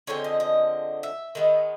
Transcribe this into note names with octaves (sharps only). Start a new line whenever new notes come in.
D3 F3 G#3 C4 C#5
D#5
D#5
E5
D#3 G#3 B3